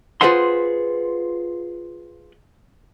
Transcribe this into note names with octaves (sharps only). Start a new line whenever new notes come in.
F4 G#4 B4 C5 F#5 C6